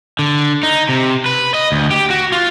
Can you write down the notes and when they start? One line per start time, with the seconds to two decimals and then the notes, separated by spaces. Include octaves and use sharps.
0.19 D3
0.63 D#4
0.89 C3
1.26 B4
1.54 D#5
1.72 D2
1.91 G4
2.10 F#4
2.32 F4